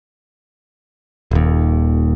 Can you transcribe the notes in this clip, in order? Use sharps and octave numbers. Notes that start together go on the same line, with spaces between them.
D#1 D#2